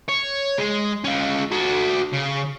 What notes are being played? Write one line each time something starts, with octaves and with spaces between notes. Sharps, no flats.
C#5
G#3
C#4 F4
F#4 A4
C#3